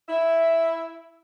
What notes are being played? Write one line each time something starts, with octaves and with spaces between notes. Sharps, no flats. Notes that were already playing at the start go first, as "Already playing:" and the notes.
E4 E5